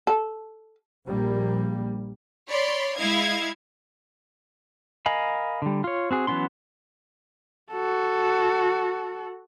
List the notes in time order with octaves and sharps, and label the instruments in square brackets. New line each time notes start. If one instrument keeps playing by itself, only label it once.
[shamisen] A4
[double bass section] A#1 G3 A#3
[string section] C#5 D5 B5 C6
G#3 E4 D#5 F5 G#6
[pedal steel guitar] A#4 D#5 F5 G#5 B5
D3 G3
F4 C#5
C4 F#4 G#4
E3 F#3 B3 C#4 C6
[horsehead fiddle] F#4 A4